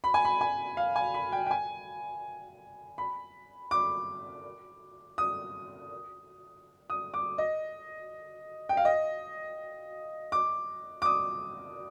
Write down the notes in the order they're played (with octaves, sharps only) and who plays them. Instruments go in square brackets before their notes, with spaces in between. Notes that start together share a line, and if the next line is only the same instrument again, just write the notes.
[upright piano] B5
G#5
B5
G#5
F5
G#5
B5
G5
G5
G#5
B5
D6
D#6
D#6
D6
D#5
G5
F5
D#5
D6
D6
D#6